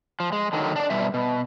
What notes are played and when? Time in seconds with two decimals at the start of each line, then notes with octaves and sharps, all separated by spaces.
0.20 F3
0.32 G#3
0.53 D3 D#3 F#3
0.76 D4 D5
0.90 B2 G3 E5
1.14 B2